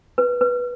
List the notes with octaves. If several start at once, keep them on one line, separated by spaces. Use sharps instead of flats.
B4
B4